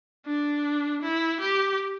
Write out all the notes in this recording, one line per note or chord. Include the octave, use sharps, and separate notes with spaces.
D4
E4
G4